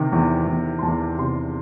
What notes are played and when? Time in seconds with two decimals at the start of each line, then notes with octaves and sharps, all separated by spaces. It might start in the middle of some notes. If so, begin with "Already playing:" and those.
Already playing: C3 D#3
0.13 E2
0.47 E2
0.79 C6
0.83 E2 A5
1.18 C3 C6